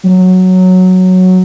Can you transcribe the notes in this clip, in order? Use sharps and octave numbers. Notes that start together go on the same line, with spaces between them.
F#3